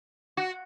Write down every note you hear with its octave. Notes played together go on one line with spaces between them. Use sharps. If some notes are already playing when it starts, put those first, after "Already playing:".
F#4